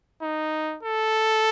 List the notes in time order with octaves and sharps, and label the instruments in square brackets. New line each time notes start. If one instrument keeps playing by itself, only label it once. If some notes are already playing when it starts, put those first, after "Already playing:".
[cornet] D#4
A4